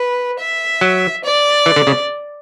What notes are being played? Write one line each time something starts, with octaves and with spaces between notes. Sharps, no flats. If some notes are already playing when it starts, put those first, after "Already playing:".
Already playing: B4
E5
F#3
D5
E3
D3
C#3